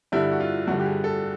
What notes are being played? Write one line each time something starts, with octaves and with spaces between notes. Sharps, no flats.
G2 D3 G3 E4
F#4
F4
G2 D3 G3 F#4
G4
G#4
A4